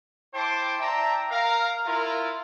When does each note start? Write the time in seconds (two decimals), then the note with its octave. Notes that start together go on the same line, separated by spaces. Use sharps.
0.34 E4 C5 G5 A5 C6 D6
0.81 D5 E5 G5 A5 A#5
1.31 A#4 F5 A#5
1.86 E4 F4 A#4